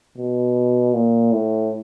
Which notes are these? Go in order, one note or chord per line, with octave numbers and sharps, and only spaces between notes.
B2
A#2
A2